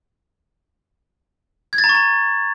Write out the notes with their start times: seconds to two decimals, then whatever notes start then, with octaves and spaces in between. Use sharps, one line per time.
1.73 G#6
1.78 A6
1.84 A#5
1.89 C#6
1.95 A#5